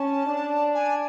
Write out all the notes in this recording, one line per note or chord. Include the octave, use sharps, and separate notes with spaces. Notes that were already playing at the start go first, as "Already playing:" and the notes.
Already playing: C#4 A5
D4
G#5